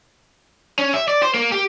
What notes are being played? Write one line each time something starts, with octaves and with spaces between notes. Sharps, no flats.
C#4
E5
D5
C5
A#3
G4